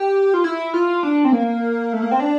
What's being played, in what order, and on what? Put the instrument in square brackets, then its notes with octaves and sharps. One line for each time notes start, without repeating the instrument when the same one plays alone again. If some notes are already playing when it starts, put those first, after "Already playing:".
Already playing: [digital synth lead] G4
F4
E4
F4
D4
C4
A#3
A3
A#3
C4
D4